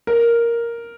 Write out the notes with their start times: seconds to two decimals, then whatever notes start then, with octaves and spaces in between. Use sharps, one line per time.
0.07 A#4